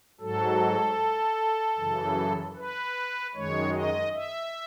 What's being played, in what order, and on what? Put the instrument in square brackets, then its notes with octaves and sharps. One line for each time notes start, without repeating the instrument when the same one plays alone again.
[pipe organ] G#2 F#3 A4
F#2 C#3 E3
B4
F#2 D#3 G#3 C#5
D#5
E5